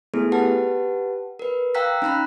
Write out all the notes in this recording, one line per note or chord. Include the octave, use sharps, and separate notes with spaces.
A3 B3 E4 G#4 A4
G4 B4 F#5 A5
A#4 B4
F5 G5 A#5 E6 F#6 B6
C#4 D#4 A#5 B5 F#6